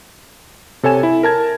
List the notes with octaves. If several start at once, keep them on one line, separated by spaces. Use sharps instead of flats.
C3 A4 C#5 G#5 E7
E4
A#4 A5 G#6